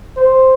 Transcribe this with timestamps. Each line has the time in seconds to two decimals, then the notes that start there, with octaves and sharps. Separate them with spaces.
0.17 C5